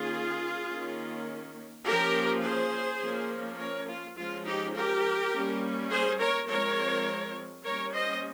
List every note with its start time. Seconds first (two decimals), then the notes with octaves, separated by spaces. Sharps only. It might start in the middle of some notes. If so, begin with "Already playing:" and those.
Already playing: D#3 A#3 C#4 F4 G#4
0.70 D#3 A#3 C#4
1.86 F3 A#3 C#4 G4 A#4
2.44 G#4 C5
3.02 F3 A#3 C#4
3.59 A#4 C#5
3.88 F4
4.17 F3 G#3 C#4 F4
4.46 D#4 G4
4.75 G4 A#4
5.33 G3 A#3 C#4
5.91 G#4 C5
6.19 A#4 C#5
6.48 F3 G#3 C4 A#4 C#5
7.64 G3 A#3 C#4 A#4 C#5
7.93 C5 D#5